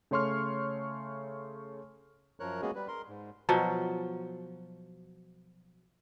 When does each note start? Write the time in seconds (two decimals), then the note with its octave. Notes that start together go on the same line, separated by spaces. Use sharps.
0.11 C#3 A3 C#5 C6 C#6 F6
2.40 F#2 F3 A#4 C#5 F#6
2.62 G#3 A#3 B3 C#4 F#4 G#4
2.75 G3 B4
2.88 A#4 C6
3.08 G#2
3.49 B2 F3 F#3